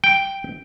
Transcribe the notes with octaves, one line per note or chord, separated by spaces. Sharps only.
G5